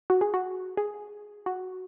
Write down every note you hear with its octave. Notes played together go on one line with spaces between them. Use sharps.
F#4
G#4
F#4
G#4
F#4